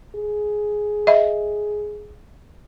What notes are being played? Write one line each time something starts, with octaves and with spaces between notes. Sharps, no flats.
G#4
D#5 E5